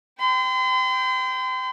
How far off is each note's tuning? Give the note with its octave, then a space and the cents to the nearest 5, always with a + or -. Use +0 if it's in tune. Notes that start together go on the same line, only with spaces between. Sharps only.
G5 +0 C6 -40